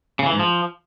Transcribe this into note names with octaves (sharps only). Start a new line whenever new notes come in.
C#3
E3
G#2
F3